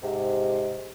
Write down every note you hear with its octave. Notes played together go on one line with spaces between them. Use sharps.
G#2 C3